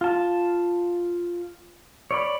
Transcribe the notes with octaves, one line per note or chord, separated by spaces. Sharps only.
F4 A5
C#5 D5 B5